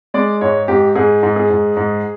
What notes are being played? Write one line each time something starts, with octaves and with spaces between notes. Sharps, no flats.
G#3 D5
G#2 C#5
G#2 G4
G#2 G#4
G#2
G#4
G#2
G#2